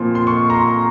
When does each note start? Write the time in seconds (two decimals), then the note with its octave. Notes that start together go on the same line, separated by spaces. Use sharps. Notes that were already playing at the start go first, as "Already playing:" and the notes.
Already playing: A#2 F3 C4 F4
0.15 C6
0.27 C#6
0.50 A#5
0.54 C6